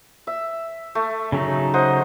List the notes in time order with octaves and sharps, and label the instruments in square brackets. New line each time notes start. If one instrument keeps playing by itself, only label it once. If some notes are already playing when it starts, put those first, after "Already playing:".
[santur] E5
A3
[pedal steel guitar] C#3 F#3 D#4
[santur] C5 D#5 F#5